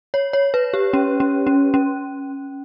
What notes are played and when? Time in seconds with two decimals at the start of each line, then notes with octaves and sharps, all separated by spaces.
0.14 C#5
0.33 C#5
0.54 B4
0.74 G4
0.93 C#4
1.20 C#4
1.47 C#4
1.74 C#4